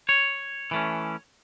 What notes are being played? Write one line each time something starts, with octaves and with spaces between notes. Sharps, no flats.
C#5
E3 A3 C#4